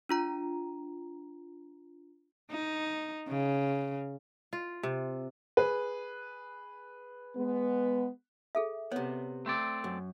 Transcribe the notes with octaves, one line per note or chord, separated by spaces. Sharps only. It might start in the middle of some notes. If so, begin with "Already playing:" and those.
D4 F4 A#5
D#4
C#3
F4
C3
G#4 B4
G#3 B3
G#4 A4 E5
C3 B3 C#5
A3 C4 D5
F#2